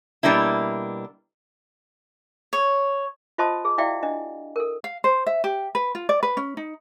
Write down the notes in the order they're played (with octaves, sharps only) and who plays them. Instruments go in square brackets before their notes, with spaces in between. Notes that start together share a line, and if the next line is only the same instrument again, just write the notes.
[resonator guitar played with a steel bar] B2 G3 A#3 D4 E4
[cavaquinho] C#5
[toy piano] F4 C5 D#5 A5 C6 D#6
G#4
E4 F#4 D5 E5 F5 G5
D4 D#5
A4 A#4
[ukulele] F5
C5
E5
G4
B4
F4
D5
B4
C#4
D#4